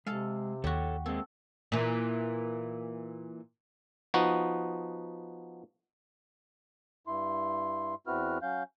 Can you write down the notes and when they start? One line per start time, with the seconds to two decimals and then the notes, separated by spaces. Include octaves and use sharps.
0.07 C3 G#3 A4 F5
0.64 D#2 F#4 G4 A4 C#5
1.06 G#3 A#3 C4 A4
1.72 A#2 E3
4.14 F3 B3 D#4 F#4
7.07 G2 E4 C6
8.07 E2 C4 E4 F#4 B4 F6
8.42 F#3 C#4 F5 G6